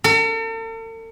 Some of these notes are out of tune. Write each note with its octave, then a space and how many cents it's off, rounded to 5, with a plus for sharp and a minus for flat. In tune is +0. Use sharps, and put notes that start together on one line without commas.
A4 +45